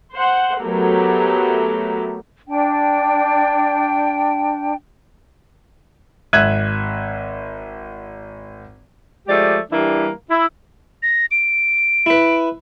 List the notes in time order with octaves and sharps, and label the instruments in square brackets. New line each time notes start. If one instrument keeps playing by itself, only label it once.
[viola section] C5 F#5
F#3 A3 B3 G4 A4 A#4
[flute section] D4 G5
[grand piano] G#1 E5 F#6 G#6 D#7
[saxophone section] F3 G#3 A3 G4 D5
E3 G3 A#3 D4 E4
E4
[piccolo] A#6
D7
[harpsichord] E4 B4